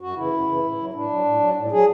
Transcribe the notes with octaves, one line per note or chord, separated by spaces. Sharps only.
F#2 F#4
C#3 E3 E4
F#2
C#3 E3
A2
F#3
A2 D4
F#3
A2
F#3
A2
F#3 G#4